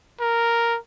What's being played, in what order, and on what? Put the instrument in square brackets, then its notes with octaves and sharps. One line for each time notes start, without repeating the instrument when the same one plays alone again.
[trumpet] A#4